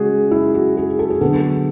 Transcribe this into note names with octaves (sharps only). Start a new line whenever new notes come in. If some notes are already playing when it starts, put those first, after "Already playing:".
Already playing: C#3 G#3 C#4 F#4 G#4
E4
F#4
G#4
A4
G#4
D3 F#3 B3 D4 A4